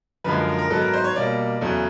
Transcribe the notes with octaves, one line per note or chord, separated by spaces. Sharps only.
F#2 D3 F3 G#3 B4
A#4
A#4
A#4
G#2 D#3 F#3 B3 A4
A#4
C5
C#5
B2 G3 A#3 D5
E2 C#3 F#3 A3